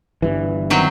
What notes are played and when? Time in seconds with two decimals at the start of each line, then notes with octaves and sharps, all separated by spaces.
0.22 G1 G2 E3
0.70 D#3 F#3 C4